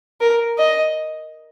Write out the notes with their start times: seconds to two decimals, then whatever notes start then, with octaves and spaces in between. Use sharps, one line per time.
0.20 A#4
0.58 D#5